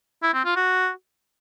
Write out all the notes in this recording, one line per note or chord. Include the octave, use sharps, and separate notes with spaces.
E4
C4
F4
F#4